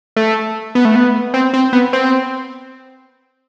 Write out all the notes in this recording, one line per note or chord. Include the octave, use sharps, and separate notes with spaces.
A3
B3
A3
B3
C4
C4
B3
C4